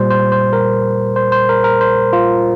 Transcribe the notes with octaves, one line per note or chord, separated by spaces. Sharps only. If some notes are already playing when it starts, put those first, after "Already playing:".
Already playing: A#2 G3 C5
C5
C5
A#4
C5
C5
A#4
A#4
C5
F4